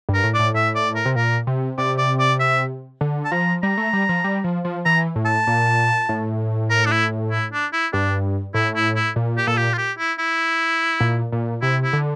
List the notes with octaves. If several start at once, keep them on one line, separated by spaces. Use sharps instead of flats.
G2
A#4
A2
D5
A2
A2 E5
D5
A#4
C3
A#2 A#4
C3
C3 D5
D5
D5
E5
D3
A5
F3 A#5
G3 A#5
A3
G3
F3
G3
F3
F3
E3 A#5
A2
A5
A#2
A2
A#4
D4
E4
E4
D4
E4
G2 D4
A2 E4
E4
E4
A#2
G4
A#2 A4
G4
F4
G4
E4
E4
A#2
A#2
C3 E4
E4
D3